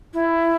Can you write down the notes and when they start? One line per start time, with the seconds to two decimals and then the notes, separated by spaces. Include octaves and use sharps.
0.14 E4